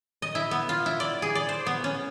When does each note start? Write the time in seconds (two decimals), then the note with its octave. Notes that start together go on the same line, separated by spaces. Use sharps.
0.22 D#5
0.35 E4
0.51 B3
0.69 F4
0.86 E4
1.00 D5
1.22 G#4
1.35 D5
1.49 C5
1.67 B3
1.84 C#4